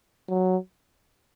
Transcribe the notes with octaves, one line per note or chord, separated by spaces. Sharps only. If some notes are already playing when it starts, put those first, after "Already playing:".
F#3